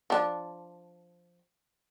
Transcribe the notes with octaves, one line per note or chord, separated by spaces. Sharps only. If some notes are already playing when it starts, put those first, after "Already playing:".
F3 D4